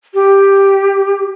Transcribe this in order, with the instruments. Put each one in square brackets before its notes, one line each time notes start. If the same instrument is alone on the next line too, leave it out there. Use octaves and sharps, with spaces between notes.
[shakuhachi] G4